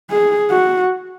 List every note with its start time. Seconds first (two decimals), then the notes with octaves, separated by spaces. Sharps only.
0.11 G#4
0.51 F#4